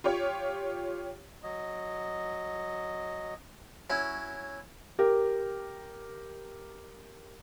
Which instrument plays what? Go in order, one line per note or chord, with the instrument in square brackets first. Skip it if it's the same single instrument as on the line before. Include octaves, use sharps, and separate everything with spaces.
[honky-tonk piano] F4 G4 C#5
[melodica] F#3 D#5
[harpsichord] F#3 C#4 E4
[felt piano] G4 A#4